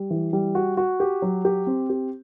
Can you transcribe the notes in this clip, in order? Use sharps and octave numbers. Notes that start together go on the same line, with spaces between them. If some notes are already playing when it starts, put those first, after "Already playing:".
Already playing: G3
E3
G3
F#4
F#4
G4
F#3
G4
C4
G4